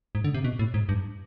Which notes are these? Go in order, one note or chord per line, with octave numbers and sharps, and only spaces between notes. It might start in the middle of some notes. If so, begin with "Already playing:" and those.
G#2
D3
C3
B2
A2
G#2
G2